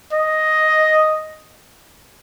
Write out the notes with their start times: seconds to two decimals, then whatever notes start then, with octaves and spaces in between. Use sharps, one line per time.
0.13 D#5